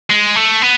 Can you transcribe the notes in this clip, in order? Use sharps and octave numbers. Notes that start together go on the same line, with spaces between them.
G#3
A3
B3